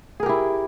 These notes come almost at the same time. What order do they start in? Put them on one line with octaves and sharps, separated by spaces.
G#4 A#4 G4 E4